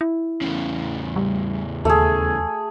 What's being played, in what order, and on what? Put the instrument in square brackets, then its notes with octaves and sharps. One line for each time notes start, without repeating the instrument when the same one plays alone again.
[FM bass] E4
[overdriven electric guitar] E2 C#3
[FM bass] G3
[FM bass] D#2 [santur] A3 G#4